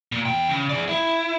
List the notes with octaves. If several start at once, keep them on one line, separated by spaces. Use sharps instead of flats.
A#2
E2 G5
C#3
G#4 D5
E4